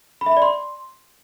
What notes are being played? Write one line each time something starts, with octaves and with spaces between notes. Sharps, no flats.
B5
E5
B5
D5
C6